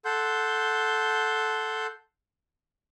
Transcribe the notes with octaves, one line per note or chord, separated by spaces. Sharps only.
A4 F#5 C6 G6